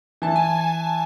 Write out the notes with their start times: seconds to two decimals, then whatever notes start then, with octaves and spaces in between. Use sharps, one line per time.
0.22 E3 A5
0.36 G#5